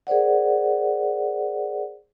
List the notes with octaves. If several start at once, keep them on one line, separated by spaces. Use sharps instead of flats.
G#4 A#4 C5 D5 F#5